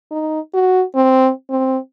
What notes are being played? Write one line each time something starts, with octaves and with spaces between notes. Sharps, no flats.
D#4
F#4
C4
C4